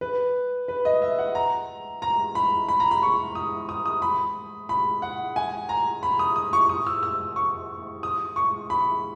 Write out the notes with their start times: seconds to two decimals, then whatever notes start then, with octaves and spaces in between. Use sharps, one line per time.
0.01 B4
0.68 B4
0.85 D#5
1.02 E5
1.19 F#5
1.35 A#5
2.02 A#5
2.35 B5
2.69 B5
2.80 A#5
2.91 B5
3.03 C#6
3.35 D#6
3.69 D#6
3.86 D#6
4.02 B5
4.69 B5
5.02 F#5
5.36 G#5
5.69 A#5
6.03 B5
6.19 D#6
6.36 D#6
6.53 C#6
6.69 D#6
6.87 E6
7.03 E6
7.36 C#6
8.03 D#6
8.36 C#6
8.70 B5